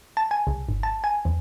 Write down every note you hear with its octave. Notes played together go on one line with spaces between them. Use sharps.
A5
G#5
C2
G1
A5
G#5
E2